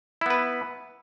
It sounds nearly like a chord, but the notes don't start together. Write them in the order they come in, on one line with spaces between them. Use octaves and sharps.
E4 B3 B4